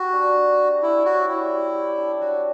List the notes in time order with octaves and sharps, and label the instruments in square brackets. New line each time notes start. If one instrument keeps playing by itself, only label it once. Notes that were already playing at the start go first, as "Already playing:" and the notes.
Already playing: [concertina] F#4 [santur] G4
[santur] D4
D4
G4
[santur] G3 [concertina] E4
[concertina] F#4 [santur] C#5
[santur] G3 [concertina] E4
[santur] C#5
G4
D4
[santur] F#3 [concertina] F#4